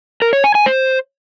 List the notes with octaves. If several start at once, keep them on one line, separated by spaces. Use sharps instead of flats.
A#4
C#5
G#5
G#5
C5